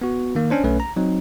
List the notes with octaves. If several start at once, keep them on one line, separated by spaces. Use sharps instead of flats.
B3 F#4
D#3 A#3
C#4 D4 C5
B1 A3 C#4 B4
A#5
F#3 C4 D#4